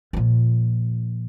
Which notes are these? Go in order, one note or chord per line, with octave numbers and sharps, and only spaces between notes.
A#2 F3